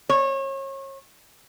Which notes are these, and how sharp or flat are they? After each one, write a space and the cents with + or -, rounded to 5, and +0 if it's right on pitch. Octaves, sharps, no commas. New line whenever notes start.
C#5 -30